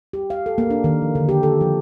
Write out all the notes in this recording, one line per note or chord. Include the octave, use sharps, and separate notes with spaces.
G4
F5
A4
A#3
D4
D#3
F3
D3
G4
A4
F3